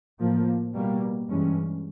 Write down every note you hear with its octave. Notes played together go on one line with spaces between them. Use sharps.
A2 F3 A#3
B2 G3 A#3
G2 E3 G#3 C#4